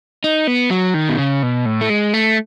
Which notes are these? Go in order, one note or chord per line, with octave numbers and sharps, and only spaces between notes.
D#4
B3
F#3
D#3
B2
C#3
B2
A2
A3
G#3
A3